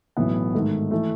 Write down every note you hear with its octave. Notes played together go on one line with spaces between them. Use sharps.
B1 A2 E3 B3 E4
G#2 D#3 A3 D#4
E3 A3